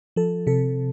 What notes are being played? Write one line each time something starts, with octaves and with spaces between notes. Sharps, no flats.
F3 A4
C3 A4